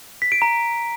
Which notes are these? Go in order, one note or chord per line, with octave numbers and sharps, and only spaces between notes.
B6
D7
A#5